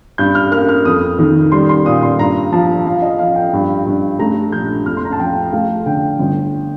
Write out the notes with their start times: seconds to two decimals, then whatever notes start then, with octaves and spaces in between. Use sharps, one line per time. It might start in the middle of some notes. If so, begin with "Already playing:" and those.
0.18 G2 G6
0.35 F6
0.52 A#3 F6
0.69 F6
0.85 F2 D#6
1.19 D#3
1.52 G3 C6
1.69 C6
1.85 A#2 D#6
2.03 C6
2.19 G2 A#5
2.52 F3 A5
2.86 F3 F5
2.96 F5
3.02 D#5
3.19 F3 F5
3.35 G5
3.53 G2
3.86 G2
4.19 A3 A#5
4.52 A#1 G6
4.86 F2 F6
4.97 C6
5.05 A#5
5.13 A5
5.19 F3 G5
5.52 A3 F5
5.86 D3 G5
6.19 G1